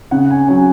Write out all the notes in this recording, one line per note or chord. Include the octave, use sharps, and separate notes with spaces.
C#3 F#5
G#5
F#3 C#4 G#5